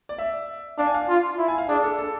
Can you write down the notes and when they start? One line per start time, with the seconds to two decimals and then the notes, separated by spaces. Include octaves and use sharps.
0.09 D5
0.18 E5
0.78 D4 F5
0.87 G#5
0.94 F5
1.08 F4
1.38 E4
1.48 G#5
1.58 F5
1.68 D4 G#4
1.83 A4
1.99 A4